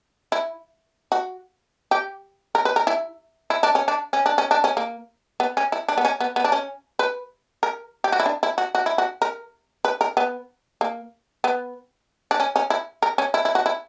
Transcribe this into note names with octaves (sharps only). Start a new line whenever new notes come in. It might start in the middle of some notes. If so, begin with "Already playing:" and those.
E4
F#4
G4
A#4
B4
A#4
E4
E4
D4
C#4
D4
C#4
D4
C#4
D4
C#4
A#3
B3
C#4
E4
D4
B3
C#4
B3
B3
D4
C#4
B4
A#4
G4
F#4
E4
D4
E4
F#4
F#4
E4
F#4
A#4
B4
A#4
B3
A#3
B3
D4
C#4
C#4
E4
A#4
C#4
E4
E4
F#4
E4